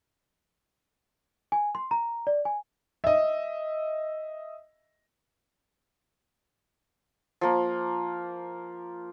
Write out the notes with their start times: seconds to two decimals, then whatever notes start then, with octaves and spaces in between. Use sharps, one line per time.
1.52 G#5
1.75 C6
1.91 A#5
2.27 D5
2.45 G#5
3.04 D#5 E5
7.41 F3 A#3